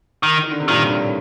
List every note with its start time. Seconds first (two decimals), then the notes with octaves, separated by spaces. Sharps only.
0.23 D#3
0.43 D#3
0.51 D3
0.60 C3
0.68 G2 A#2 D#3
0.80 A2
0.90 G2 A#2
1.01 A2